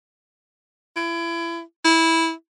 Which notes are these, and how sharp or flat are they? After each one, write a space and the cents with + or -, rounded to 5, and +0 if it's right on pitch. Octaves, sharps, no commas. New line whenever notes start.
E4 +30
E4 -10